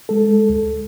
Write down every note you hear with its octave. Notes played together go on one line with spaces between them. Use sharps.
G#3 A4
D2